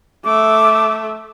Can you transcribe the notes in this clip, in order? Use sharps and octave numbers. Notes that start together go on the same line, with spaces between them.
A3 E5 D6